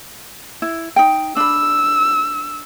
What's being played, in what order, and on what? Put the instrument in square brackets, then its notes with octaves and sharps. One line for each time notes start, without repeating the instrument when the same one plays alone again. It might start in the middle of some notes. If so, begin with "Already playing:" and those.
[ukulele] E4
D#4 G5
[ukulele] D4 B5 [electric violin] E6